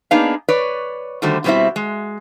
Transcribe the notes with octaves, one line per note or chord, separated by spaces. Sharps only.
A#3 B3 D4 D#4 G#4 F5
B4 C#5 D5
D3 D#3 G3 A3 F#4 C5
B2 D3 G3 C4 E4 E5
G#3